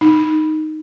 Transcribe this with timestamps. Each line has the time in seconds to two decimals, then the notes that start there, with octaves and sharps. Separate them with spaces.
0.01 D#4